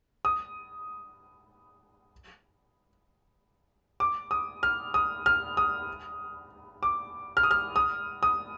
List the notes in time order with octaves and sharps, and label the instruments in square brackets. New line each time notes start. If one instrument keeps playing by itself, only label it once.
[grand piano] D#6
D6
D#6
F6
D#6
F6
D#6
D6
F6
D#6
F6
D#6
D#6